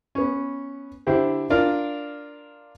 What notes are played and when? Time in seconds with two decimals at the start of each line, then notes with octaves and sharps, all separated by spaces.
0.15 B3 C#4
1.07 D3 E4 G4 C5
1.50 D4 F4 A#4 D5